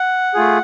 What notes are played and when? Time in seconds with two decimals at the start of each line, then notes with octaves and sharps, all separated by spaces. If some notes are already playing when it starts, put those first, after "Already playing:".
Already playing: F#5
0.34 A3 F4 G#4